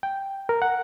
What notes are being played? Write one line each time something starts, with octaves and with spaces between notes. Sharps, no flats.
G5
A#4
F#5